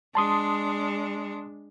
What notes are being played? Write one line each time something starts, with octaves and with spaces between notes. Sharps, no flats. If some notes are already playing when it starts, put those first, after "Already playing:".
G#3 D4 A5 C6 D#6